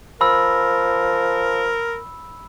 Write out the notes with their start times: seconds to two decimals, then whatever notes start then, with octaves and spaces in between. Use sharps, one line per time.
0.21 F3 A#4 B5 E6